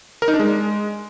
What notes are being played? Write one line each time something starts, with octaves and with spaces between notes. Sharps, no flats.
A#4
D#4
D4
G#3